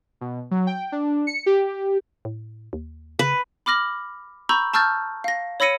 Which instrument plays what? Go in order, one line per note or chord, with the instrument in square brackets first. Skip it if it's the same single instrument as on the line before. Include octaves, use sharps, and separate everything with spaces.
[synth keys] B2
F#3
G5
D4
C#7
G4
[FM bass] A2
D#2
[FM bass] C#3 [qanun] B4
[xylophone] B5 D6 F6 A#6 F#7
A#5 B5 C#6 E6 G6
A5 C#6 E6 F6 G6 A6
F5 A#6
C#5 B5 E6 A#6 C#7 D#7